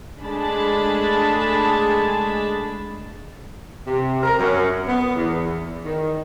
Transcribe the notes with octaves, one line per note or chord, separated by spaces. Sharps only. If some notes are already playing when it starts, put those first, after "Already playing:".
G#3 A3 D4 G#4 A5 B5
C3
A#4
F#2
B3
E2
D#3